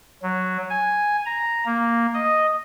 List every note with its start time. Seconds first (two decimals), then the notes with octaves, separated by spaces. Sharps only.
0.23 F#3
0.70 G#5
1.26 A#5
1.66 A#3
2.14 D#5